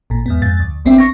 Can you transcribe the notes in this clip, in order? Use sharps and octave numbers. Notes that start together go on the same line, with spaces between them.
A1 A#2
E2 G#2 B3
F2 G#2 A6
D2
G#1 C#2 B3 C4 D4 E5
C#6 A#6